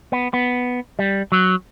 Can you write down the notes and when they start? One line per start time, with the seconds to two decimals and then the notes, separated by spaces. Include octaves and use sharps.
0.12 B3
0.34 B3
0.99 G3
1.32 F#3